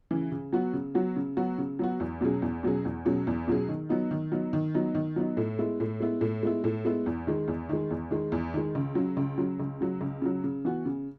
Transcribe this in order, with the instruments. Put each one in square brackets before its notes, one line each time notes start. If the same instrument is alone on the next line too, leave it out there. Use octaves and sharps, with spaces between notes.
[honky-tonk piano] C#3 E3
C#3
F#3 B3 F#4
C#3
F#3 B3 F#4
C#3
F#3 B3 F#4
C#3
F#3 B3 F#4
E2
B2 F#3 C#4 G#4
E2
B2 F#3 C#4 G#4
E2
B2 F#3 C#4 G#4
E2
B2 F#3 C#4 G#4
D#3
F#3 B3 D#4
D#3
F#3 B3 D#4
D#3
F#3 B3 D#4
D#3
F#3 B3 D#4
A2
G#3 B3 E4
A2
G#3 B3 E4
A2
G#3 B3 E4
A2
G#3 B3 E4
E2
D#3 G#3
E2
D#3 G#3
E2
D#3 G#3
E2
D#3 G#3
C#2
C#3 F#3
C#2
C#3 F#3
C#2
C#3 F#3
C#2
C#3 F#3
C#3
E3 B3 F#4
C#3